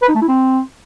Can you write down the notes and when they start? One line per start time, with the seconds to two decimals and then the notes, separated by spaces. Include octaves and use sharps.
0.02 B4
0.09 D#4
0.15 A3
0.22 E4
0.28 C4